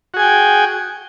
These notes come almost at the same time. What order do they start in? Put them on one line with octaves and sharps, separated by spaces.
F#4 G#4 G#5 G5